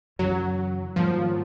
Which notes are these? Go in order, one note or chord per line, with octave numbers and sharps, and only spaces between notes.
F#2 C#3 E3 F#3
G#2 D#3 F3 G3 A#3